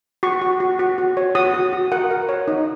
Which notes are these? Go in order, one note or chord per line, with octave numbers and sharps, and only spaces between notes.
F#4 C#6
F#4
F#4
F#4
F#4
C#5
F#4 D#6
F#4
F#4
A#4 F#5
A#4
C#5
D#4